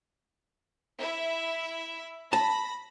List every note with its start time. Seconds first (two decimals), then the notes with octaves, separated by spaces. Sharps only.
0.99 E4 E5
2.33 A5 B5 A#6